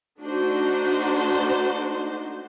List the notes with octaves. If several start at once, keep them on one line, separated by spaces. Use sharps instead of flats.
A3 D4 D#4 F#4 C5